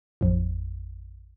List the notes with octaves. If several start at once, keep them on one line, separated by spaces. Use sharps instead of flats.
A1 F2